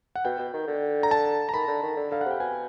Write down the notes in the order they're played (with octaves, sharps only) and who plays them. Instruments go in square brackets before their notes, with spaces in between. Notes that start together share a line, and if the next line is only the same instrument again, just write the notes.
[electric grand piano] F#5
[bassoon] B2 [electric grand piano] G5
[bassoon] B2
D#3
D3
[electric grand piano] A#5
A5
A#5
[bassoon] D#3 [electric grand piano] B5
[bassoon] D3
D#3
D3
[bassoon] D3 [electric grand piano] F5
[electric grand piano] F#5
[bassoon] C3 [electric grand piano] G5
[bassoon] B2 [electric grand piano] G#5